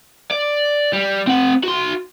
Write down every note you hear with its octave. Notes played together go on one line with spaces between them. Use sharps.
D5
G3
C4 F#5
F#4 C6